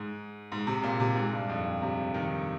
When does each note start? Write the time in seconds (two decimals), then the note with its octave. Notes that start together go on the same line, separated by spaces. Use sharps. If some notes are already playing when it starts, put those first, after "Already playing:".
Already playing: G#2
0.52 G#2
0.67 C3
0.83 A#2
1.00 C3
1.16 G#2
1.32 G2
1.49 F2
1.82 C3
2.14 D#3